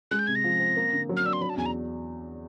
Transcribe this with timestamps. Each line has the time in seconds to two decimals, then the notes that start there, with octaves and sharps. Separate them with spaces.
0.11 G#3 F#6
0.19 G6
0.27 C3 G#6
0.35 A#6
0.44 F3
0.59 C4
0.76 A#3
0.93 D3
1.09 F#3
1.17 F6
1.25 D4 E6
1.33 C6
1.41 F#3 B5
1.50 A5
1.57 E2 G#5
1.66 A#5